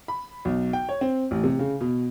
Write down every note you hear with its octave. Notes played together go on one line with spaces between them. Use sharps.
B5
B1
G5
C#5
C4
A1
C3
C#3
B2